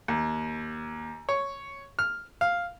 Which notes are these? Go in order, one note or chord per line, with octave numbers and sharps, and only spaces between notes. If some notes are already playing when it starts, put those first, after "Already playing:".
D#2
C#5
F6
F5